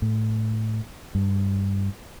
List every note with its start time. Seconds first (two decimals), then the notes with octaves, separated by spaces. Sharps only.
0.02 A2
1.15 G2